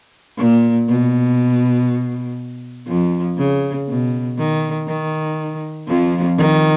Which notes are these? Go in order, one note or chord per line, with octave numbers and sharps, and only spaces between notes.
A#2
B2
F2 F3
C#3
B2
D#3
D#3
F2 F3
D#3